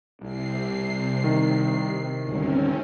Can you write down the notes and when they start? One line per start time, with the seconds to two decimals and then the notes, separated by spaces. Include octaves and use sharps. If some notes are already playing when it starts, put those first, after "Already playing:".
0.21 C2 C3 C7
1.24 D#3
2.27 G#1 D2 G3 C4 C#4